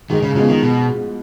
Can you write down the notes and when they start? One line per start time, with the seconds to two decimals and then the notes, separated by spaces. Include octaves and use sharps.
0.10 G#2 D#3
0.22 C#3
0.35 C#3 F3 G#3 B3
0.49 D#3
0.62 B2